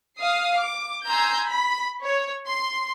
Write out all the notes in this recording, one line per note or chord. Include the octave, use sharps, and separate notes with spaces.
F5 D#6 C7
D6
G#5 A#5 C6 E6 G6
B5
C#5
C6